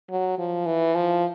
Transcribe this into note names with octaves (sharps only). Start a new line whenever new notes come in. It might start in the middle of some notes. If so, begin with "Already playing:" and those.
F#3
F3
E3
F3